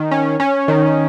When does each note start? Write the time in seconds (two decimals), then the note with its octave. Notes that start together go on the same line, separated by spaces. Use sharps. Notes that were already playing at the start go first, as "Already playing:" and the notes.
Already playing: D#3
0.11 C#4
0.40 C#4
0.68 D#3